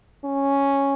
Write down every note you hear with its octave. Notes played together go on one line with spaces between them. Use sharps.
C#4